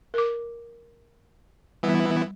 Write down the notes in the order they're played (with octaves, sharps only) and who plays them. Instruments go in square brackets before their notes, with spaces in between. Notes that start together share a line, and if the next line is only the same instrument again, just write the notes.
[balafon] A#4 D6
[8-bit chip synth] E3 B3 E4 [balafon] G3